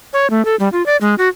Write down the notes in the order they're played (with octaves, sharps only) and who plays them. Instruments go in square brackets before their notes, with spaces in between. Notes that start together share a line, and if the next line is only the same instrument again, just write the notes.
[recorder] C#5
A3
A4
G3
F4
D5
G#3
F#4